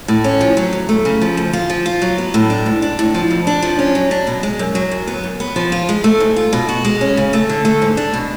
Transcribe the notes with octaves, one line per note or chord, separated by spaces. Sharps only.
A2
C#4
F3
F#3
D2
A3
C#3
F3
D2
F4
F3
F4
F#3
B3
A2
D4
G#2
D4
A2
F3
F2
D4
F3
C#4
F#3
D4
B2
G#3
F#2
F#3
F#2
B3
F#2
B3
F3
F4
G#3
A3
G#2
F4
B2
F#4
G#3
C#4
C#3
A3
D3
A3
G#2
D4
B2